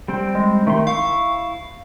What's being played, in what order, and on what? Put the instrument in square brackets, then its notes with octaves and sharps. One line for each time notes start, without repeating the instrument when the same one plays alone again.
[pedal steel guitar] G3 C4 G5
[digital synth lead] G#3
[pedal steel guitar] D#3 C6 [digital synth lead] A3
[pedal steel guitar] E4 C#6 [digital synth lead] F5